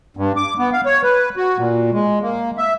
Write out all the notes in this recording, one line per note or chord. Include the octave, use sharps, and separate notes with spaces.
G2
D6
B3
F5
C#5
B4
F#4
A#2
G#3
A#3
E5